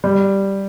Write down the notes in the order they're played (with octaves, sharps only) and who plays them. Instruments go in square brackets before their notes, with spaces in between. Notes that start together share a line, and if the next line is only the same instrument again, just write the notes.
[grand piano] G3